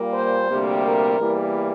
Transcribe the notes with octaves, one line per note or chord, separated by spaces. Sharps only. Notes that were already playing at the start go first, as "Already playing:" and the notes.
Already playing: A#2 G3 A#3
C5
D2 C3 G3 A#3
A#4
E2 E3 G3 A#3